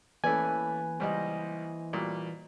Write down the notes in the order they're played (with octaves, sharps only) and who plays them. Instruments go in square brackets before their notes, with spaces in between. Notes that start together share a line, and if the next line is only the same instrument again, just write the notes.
[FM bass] E3 [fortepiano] A3 C#4 D5 [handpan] A#3 B4 [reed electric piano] G#5
[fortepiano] C#2 G3 [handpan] C5 D#5
[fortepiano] A#2 G3 F#4